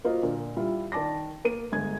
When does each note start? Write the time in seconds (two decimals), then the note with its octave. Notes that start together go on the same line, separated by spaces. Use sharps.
0.04 A#3 F4 F#4 A#4 C5 D#5
0.22 A#2 D3 A#4
0.57 G3 E4 F4
0.92 D#3 D5 A5 D6 A#6
1.45 A#3 D#7
1.72 G1 G#3 G#6